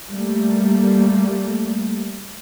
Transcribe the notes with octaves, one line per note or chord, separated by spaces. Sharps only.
G3 A3 A#3